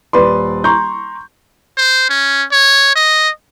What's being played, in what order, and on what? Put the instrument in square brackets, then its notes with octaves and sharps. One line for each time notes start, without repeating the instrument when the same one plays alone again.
[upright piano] D#1 B4 D5 C6
A#5 C6 C#6 G6
[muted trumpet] C5
C#4
C#5
D#5